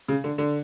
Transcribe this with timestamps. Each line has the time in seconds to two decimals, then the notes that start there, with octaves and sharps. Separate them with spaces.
0.08 C#3
0.24 D3
0.38 D3